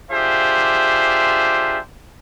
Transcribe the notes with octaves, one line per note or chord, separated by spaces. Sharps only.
D4 F4 G4 G#4 C5 E5